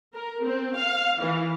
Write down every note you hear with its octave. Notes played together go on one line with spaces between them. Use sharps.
A#4
C4
F5
E3